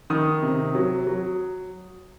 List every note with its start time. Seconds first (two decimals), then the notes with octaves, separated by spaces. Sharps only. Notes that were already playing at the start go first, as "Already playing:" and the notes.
0.10 D#3 D#6
0.42 C3
0.75 F#3
1.07 F#3